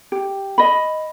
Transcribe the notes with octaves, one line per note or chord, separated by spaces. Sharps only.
G4
D#5 B5